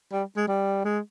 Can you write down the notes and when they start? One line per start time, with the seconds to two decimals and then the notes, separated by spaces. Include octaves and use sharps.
0.12 G3
0.37 G#3
0.48 G3
0.85 G#3